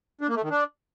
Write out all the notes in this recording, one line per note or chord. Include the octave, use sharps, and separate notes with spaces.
D4
A#3
A3
D#3
D4